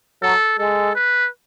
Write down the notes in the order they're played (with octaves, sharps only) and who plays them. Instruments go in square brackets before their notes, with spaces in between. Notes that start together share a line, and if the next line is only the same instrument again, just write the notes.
[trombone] F#3 [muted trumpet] A4
[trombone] G#3 [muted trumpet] A4
[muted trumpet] B4